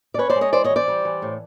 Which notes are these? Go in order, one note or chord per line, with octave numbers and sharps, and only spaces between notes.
D5
C#4 B4 C#5
C5 D5
G#3
C#5 D#5
E3 C5 D5
C#5 D#5
E3
C5 D5
G3
E3
A2